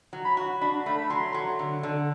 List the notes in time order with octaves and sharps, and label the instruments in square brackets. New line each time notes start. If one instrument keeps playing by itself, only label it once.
[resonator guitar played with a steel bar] F#3
[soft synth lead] B5
[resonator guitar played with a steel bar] F#4
[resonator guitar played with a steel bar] D4 [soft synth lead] B5
[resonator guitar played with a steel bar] A3 [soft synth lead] B5
[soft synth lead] B5
[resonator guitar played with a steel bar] F#3 [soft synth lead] C6
[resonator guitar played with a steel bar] F#3
D3
D3